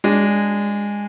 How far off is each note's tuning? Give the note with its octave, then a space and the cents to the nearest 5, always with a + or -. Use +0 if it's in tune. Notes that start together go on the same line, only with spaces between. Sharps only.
G#3 -20 D4 -15